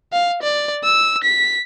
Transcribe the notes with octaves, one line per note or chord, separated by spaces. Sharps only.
F5
D5
E6
B6